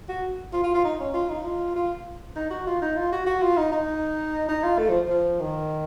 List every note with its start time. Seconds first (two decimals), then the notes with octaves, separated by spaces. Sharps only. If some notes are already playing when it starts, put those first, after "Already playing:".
0.09 F#4
0.53 F4
0.64 F4
0.74 F4
0.84 D#4
1.00 C#4
1.14 F4
1.29 D#4
1.45 F4
1.75 F4
2.36 D#4
2.51 F#4
2.67 F4
2.82 D#4
2.97 F4
3.12 F#4
3.26 F#4
3.42 F4
3.57 D#4
3.72 D#4
4.49 D#4
4.63 F4
4.78 A3
4.89 F3
5.09 F3
5.40 D#3